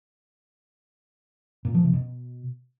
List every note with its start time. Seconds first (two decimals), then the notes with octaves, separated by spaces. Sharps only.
1.65 A#2
1.74 F3
1.84 C3
1.93 B2